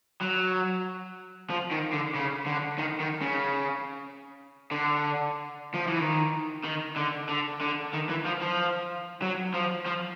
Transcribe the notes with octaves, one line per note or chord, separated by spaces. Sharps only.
F#3
F3
D#3
D3
C#3
D3
D#3
D#3
C#3
D3
F3
E3
D#3
D#3
D3
D3
D3
D#3
E3
F3
F3
F#3
F3
F3